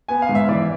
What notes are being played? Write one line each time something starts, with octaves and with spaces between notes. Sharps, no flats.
B3 G#5
F5
G#2
E5
E3 D5